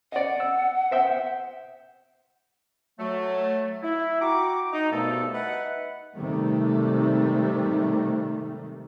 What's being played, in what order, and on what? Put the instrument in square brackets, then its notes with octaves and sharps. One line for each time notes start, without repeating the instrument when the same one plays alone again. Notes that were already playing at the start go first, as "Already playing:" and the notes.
[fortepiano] D5 D#5 [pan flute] F#5
[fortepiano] E6
C5 E5 G5
[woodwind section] F#3 A3
E4
F#4 G5 A#5 D6
D#4
C2 G2 B2 A3 B3 A4
D#4 B4 E5 F#5
[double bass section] G#2 C3 D#3 G3 A3